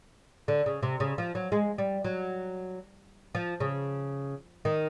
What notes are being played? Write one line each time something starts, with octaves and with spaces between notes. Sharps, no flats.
D3
C#3
C3
C#3
F3
F#3
G#3
G3
F#3
F3
C#3
D#3